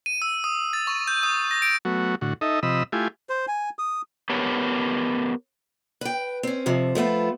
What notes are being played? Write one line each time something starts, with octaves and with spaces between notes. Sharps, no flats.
D#7
E6
D#6
A6
C#6
G6
D#6
A#6
D7
F#3 A3 B3 F#4
A2 D3 F#4
D#4 A4 D#5 E5
C3 F3 D#5 B5 E6
A3 E4 F4 G4 G#5
C5
G#5
D#6
B3 G4 A4 A#4 C#5
B4 G5
C4 C#4
F2 C3 F3
F3 A3 B3 F4